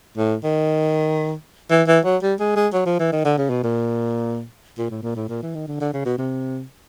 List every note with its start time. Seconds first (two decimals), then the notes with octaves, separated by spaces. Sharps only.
0.17 A2
0.44 D#3
1.71 E3
1.88 E3
2.05 F#3
2.23 G3
2.40 G#3
2.56 G#3
2.73 F#3
2.86 F3
3.00 E3
3.12 D#3
3.25 D3
3.38 C#3
3.50 B2
3.63 A#2
4.78 A#2
4.90 A2
5.03 A#2
5.16 A2
5.29 A#2
5.42 E3
5.55 D#3
5.67 D3
5.80 D3
5.94 C#3
6.05 B2
6.18 C3